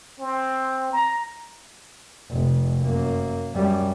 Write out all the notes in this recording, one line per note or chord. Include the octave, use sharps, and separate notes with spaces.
C4
A#5
F1
F#2 A#3
F#2 G3